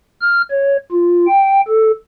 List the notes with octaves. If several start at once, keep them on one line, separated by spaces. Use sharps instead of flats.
F6
C#5
F4
G5
A4